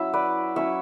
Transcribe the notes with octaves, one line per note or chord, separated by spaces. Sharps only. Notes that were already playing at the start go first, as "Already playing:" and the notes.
Already playing: F#3 C#4 E4 E5
B4 D5
F#3 C#4 E4 C#5 E5